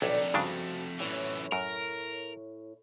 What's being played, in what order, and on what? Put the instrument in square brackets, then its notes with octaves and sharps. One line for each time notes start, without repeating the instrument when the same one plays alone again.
[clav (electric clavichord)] B1 [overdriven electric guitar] F2 A3 [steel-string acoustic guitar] A#2 D#3 D4
[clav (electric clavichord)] G2 C#3 D4 [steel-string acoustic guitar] F3 F#4
[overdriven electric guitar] F#2 E3 [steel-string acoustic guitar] A2 C#5
[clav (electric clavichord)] F#2 [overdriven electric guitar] A#4